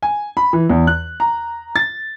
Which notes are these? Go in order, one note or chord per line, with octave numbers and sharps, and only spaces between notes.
G#5
B5
E3
E2
F#6
A#5
A6